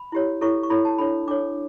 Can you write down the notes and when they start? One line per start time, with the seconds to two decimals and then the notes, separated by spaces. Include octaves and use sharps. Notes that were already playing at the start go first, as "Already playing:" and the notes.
Already playing: B5
0.12 E4 G4 C#5
0.41 E4 A4 C#5 C#6
0.63 C#6
0.70 E4 A4 C#5 B5
0.85 A5
0.98 D4 A4 C#5 B5
1.28 D4 A4 C#5 D6